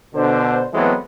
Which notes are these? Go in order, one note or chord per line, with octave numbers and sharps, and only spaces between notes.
B2 D3 C5
E3 F#3 G#3 A3 B3 C4